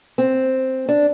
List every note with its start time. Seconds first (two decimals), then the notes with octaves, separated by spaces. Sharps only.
0.18 C4
0.88 D4